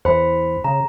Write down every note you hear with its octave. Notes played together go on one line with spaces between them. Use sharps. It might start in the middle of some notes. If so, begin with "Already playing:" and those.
E2 C5 B5
C#3 A#5